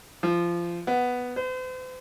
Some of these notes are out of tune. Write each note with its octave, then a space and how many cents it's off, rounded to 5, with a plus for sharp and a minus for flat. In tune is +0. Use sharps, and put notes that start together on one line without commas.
F3 -20
B3 +0
C5 -45